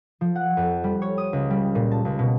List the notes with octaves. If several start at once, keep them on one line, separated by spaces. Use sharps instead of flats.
F3
F#5
F2
G3
C#5
D#6
C#2
G3
A#2
A5
C#2
B2